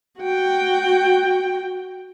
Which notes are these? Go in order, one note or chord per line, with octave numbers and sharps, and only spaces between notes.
F#4 G5